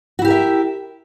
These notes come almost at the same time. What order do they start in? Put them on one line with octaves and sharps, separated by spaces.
F#4 E4 G4 A#4 E5